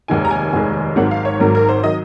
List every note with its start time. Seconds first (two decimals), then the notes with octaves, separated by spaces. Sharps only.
0.08 F1 D#2 D#3 G#3 G#5
0.25 A#5
0.31 G#5
0.53 F1 D#2 D#3 G#3
0.96 G#1 G#2 D#3 F#3 F#5
1.11 F5
1.25 C#5
1.40 G#1 G#2 D#3 F#3 A#4
1.55 A#4
1.69 C5
1.83 D#3 F#3 D#5